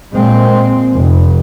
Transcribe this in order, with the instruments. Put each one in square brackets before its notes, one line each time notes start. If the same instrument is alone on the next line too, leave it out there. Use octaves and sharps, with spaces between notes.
[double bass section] A#2 G#3 C4
F1